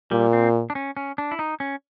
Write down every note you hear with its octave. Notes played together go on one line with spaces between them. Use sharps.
A#2 G3
C4
D4
C#4
C#4
D4
E4
D#4
C#4